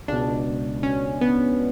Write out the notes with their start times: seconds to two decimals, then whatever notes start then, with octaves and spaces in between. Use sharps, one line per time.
0.08 C#2 B2 D4
0.83 C#4
1.21 B3